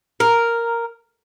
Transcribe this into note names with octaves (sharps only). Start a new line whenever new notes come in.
A#4